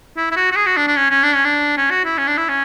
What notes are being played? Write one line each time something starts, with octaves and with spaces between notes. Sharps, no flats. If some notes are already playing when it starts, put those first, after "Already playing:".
E4
E4
F#4
F#4
G#4
F#4
D4
D4
C#4
C#4
D4
C#4
D4
C#4
F#4
E4
C#4
D4
E4
C#4